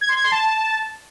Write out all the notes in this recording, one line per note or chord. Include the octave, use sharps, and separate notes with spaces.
G#6
C6
G#6
C6
A5